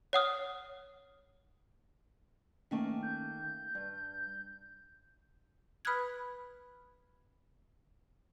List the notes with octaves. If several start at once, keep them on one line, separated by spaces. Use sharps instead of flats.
C#5 F#5 D#6 F6
D#3 A3 A#3 C#4
G6
G2
B4 B5 D#6 F6 F#6 G#6